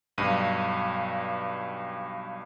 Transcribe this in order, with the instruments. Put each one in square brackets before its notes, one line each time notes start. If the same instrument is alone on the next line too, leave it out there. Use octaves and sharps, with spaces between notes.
[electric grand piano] B1 G2 D#7